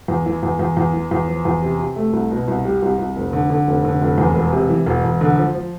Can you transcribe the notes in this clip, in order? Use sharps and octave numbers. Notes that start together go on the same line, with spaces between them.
E2
E3
E2
E2
E2
E3
E2
F3
E2
C3
C3
A3
C2
B2
C2
G3
C2
C2
F1
D3
D3
F1
D3
F1
E2
E1
C3
E3
E1
E1
D3
F3
F3